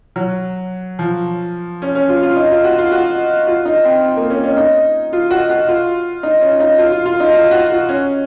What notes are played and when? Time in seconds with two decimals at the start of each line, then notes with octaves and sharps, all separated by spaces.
0.16 F#3
0.99 F3
1.82 C#4
1.95 C#4
2.09 F4
2.23 F4
2.36 D#4
2.51 F4
2.64 F#4
2.78 F4
2.92 F#4
3.47 F4
3.65 D#4
3.85 C4
4.17 A#3
4.30 C#4
4.43 C#4
4.57 D#4
5.13 F4
5.31 F#4
5.49 F#4
5.68 F4
6.23 D#4
6.41 C#4
6.60 D#4
6.78 F4
6.92 F4
7.06 F4
7.20 D#4
7.34 F4
7.51 F#4
7.71 F4
7.89 C#4